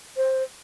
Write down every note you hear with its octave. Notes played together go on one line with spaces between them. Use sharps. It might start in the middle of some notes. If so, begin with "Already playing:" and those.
C5